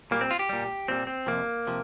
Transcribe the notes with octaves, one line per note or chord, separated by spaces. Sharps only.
A#2 G3 A#3
C4
F4
G4
A#2 G3
A#2 G3 C4
C4
F2 C3 F3 A#3
C3 F3